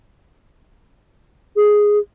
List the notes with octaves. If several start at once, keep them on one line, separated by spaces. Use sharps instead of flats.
G#4